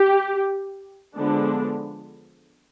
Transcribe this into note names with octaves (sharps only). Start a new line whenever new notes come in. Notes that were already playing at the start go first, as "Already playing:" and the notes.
Already playing: G4
D3 F3 G#3 B3 D4